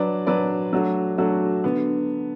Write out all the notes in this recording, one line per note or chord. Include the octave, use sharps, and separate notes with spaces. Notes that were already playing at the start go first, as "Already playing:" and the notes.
Already playing: F#3 D4 B4 D5
F#3 D4 B4 D5
F#3 A3 D4 F#4
F#3 A3 D4 F#4
D3 B3